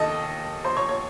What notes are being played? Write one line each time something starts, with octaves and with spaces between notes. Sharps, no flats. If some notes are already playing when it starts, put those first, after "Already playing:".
Already playing: D#2 D#3 A4 D#5 A5 D#6
C5 C6
C#5 C#6
C#5 C#6